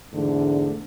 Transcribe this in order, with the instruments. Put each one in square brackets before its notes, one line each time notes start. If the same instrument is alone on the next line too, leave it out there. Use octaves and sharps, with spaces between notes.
[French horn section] E2 G#2 D3 A3